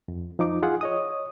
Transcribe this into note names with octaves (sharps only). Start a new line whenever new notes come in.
F2
F3 D#4 D6
F4 G#4 F#5
C#5 D#5 D#6